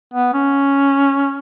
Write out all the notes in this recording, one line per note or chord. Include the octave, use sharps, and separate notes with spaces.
B3
C#4